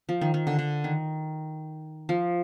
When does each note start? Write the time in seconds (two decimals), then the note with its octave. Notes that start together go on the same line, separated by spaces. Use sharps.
0.09 F3
0.21 D#3
0.34 D#3
0.47 D3
0.59 D3
0.84 D#3
2.09 F3